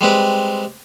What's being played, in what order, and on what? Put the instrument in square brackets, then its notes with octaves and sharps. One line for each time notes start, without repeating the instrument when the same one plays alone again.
[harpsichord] G3 G#3 C4 B4